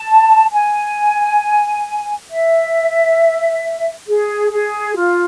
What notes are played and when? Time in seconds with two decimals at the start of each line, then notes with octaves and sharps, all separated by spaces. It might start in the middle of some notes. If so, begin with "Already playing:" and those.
Already playing: A5
0.53 G#5
2.30 E5
4.07 G#4
4.51 G#4
4.96 F4